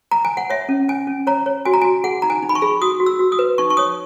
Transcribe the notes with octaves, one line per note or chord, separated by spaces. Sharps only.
A#5
G#5
F#5
C#5 E5
C#4
C#4 G#5
C#4
C#5 A#5
C#5
F#4 G#5
A#5
F#4 G#5
G#4 F#5
D#4 A#5
G#5
D#4
B5
C#6
G#4
F#4 D#6
F#4
E6
F#4
D#6
B4
D#4 C#6
C#6
C#5 D#6